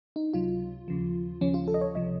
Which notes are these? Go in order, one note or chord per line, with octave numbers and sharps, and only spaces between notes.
D#4
C#2 C3 F#3 F4
D#2 C#3 F3
D#2 C#3 F3 C#4
F4
A4
D#5
C#5
C#2 C3 F3 D#5